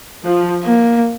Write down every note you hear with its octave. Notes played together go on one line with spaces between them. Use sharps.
F3
A#3